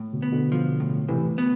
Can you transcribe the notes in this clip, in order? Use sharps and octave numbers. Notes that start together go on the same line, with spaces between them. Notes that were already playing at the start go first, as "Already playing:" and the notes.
Already playing: A2
B2 D3
B3
B2 D3
F3
A2
A2 C3 E3
B3